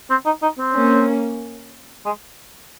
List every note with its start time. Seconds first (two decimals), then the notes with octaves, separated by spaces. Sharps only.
0.10 C4
0.26 D#4
0.42 D#4
0.58 C4
0.75 A#3 C#4
2.06 G#3